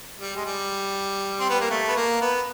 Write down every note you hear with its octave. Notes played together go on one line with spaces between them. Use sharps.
G3
G#3
G3
C4
B3
A#3
A3
B3
A#3
B3